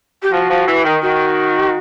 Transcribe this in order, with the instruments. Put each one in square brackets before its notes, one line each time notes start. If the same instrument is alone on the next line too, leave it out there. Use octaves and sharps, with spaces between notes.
[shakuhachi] G4
[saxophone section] F3 [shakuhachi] F#4
[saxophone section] F3
E3
D#3
[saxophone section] D#3 [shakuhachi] F#4